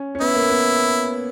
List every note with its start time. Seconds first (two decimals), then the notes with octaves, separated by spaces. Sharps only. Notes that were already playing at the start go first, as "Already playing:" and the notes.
Already playing: C#4
0.15 C#4
0.21 B3 E4
0.35 A#3
0.50 B3